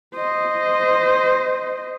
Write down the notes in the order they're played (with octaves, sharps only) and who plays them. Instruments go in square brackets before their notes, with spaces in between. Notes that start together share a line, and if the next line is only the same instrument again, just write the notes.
[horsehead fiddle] C5 D#5